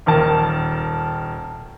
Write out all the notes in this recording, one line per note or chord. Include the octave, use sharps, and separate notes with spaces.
D#1 D#3 A#4 A5